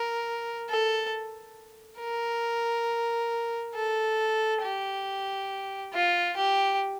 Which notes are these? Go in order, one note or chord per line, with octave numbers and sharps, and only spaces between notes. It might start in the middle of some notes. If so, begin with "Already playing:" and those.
Already playing: A#4
A4
A#4
A4
G4
F4
G4